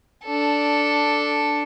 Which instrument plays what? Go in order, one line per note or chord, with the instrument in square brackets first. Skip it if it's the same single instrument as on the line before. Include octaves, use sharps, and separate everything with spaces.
[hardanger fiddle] D4 A4